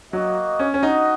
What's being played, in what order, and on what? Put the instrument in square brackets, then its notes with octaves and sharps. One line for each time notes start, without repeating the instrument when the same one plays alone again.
[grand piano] F#3 [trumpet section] A#3 F#4 D#5
[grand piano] C#4
C#4
[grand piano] D#4 [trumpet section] F#4 D#5 F#5